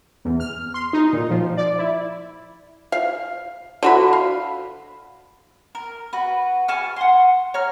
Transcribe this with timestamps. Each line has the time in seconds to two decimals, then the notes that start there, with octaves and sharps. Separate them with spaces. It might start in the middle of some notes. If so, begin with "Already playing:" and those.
0.25 E2
0.40 F6
0.74 C6
0.93 D#4
1.13 A#2
1.30 F3
1.57 D5
1.79 E4
2.92 F5
3.83 D3 F#4 B5
4.13 F5
5.75 A#4
6.13 F#4 B4
6.68 G#5 A5 C#6 F6
6.96 F#5 C6
7.54 C#5 A#5 F6